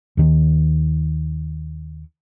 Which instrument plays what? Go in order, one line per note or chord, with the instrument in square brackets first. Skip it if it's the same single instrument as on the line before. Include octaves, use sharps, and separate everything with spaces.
[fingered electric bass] D#2 D#3